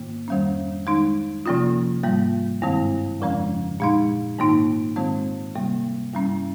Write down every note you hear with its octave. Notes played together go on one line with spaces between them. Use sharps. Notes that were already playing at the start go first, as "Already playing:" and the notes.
Already playing: G#2 D#3 A#3
F2 D#3 G3 C#4
D#3 G#3 D#4
C3 F3 A#3 C#4 F4
G#2 G3 A#3
G2 D#3 G#3 C4
F2 C#3 F3 G#3 C#4
A#2 G#3 D#4
G#2 D#3 A#3 D#4
G#2 D#3 G#3 C4
C3 G3 A#3
G2 G3 C#4